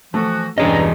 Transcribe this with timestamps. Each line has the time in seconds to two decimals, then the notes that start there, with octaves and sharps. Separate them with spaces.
0.14 E3 F3 A3 F#4
0.58 E2 G2 G3 C#4 G#4 D#5 A#5